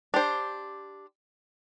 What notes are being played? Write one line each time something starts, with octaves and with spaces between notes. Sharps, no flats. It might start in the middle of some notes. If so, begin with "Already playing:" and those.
D4 G4 C5